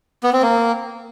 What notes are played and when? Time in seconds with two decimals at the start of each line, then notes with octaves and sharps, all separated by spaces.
0.24 B3
0.33 C4
0.42 A#3